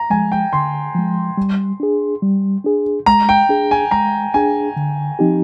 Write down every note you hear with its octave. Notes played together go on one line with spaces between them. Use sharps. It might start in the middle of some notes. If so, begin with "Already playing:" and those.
Already playing: A#5
F3 G#3 G#5
G5
D3 C6
F3 G#3
G3
D4 G#4
G3
D4 G#4
G#3 A#5
G5
D4 G#4
G#5
G#3 A#5
D4 G#4 G#5
D3
F3 C4 D#4 G4